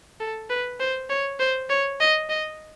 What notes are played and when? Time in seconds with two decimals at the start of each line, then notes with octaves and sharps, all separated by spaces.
0.20 A4
0.50 B4
0.80 C5
1.10 C#5
1.39 C5
1.70 C#5
2.00 D#5
2.30 D#5